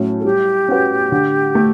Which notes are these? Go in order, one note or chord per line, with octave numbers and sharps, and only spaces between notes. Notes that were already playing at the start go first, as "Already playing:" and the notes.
Already playing: A2 F#3 A3 C#4
A4
G3 G4
C#4 F#4 B4
D3
A3